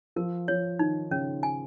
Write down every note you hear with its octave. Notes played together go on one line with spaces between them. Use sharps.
F3 A#4
F3 C#5
D#3 D#4
C#3 C#4
G#5